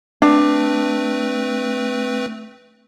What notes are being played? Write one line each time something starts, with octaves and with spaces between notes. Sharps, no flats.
A3 C4 D4 B4